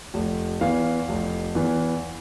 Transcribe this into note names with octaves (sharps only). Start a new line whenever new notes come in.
F1
E2 E3 F5
F1
E2 E3